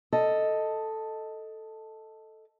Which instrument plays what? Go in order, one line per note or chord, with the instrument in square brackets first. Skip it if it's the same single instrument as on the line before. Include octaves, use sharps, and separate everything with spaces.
[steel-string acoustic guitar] A4 D#5